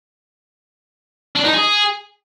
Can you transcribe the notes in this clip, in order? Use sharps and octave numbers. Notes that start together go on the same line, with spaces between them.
D4
D#4
G#4